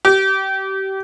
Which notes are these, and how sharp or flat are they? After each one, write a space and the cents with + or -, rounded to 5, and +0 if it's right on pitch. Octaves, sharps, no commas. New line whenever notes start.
G4 -25